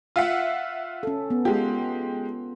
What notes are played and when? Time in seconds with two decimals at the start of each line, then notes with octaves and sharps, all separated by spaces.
0.16 F4 E5 F#5
1.03 C#4 A4
1.30 B3
1.45 G#3 F4 G4